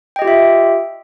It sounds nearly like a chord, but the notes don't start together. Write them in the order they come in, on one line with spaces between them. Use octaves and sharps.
G5 D#5 G4 F4 E5